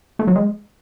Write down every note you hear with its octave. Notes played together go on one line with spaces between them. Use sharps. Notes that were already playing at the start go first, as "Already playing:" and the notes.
A3
F#3
G#3